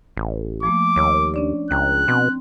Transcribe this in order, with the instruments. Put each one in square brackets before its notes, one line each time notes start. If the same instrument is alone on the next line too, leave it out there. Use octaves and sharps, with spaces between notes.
[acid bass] A1
[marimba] F3 A3 A#3 [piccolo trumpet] D6
[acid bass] D#2 [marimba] C#5 E6
[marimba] C#4 D4 D5
[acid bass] C#2 [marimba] G5 A#5 [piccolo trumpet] F#6
[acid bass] B2 [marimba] C4